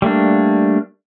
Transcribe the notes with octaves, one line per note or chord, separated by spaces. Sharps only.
G3 A3 A#3 D4